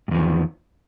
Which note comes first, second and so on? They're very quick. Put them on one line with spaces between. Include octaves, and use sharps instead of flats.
G2 E2 F3 D#3